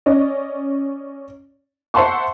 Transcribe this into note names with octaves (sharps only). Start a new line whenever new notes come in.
C#4 D5 D#5
C5 E5 F#5 A5 C6 C#6